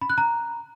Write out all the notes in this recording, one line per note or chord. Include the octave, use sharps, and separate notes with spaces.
B5
F#6
A#5